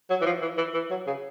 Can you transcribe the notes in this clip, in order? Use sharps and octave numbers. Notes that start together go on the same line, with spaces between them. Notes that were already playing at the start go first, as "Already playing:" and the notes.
F#3
E3
F3
E3
E3
E3
F#3
C#3